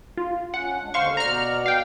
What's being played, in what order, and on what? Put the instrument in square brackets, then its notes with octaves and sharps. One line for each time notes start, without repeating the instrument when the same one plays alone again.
[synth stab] F4
[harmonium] C#4 [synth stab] F#5
[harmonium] G#3 D4
[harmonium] D#2 D3 [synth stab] C5 F5 C#6
[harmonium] B2 D5 F#5 [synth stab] A#5 F6
[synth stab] F5 G5